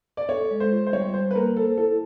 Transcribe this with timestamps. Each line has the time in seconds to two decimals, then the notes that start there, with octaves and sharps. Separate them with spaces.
0.17 D5
0.28 A4 C#5
0.51 G#3
0.60 C5
0.72 F4
0.87 C5
0.92 G3 C#5
1.14 G3 C5
1.31 B4
1.35 A#3 A#4
1.56 A4 C5
1.77 E4 A4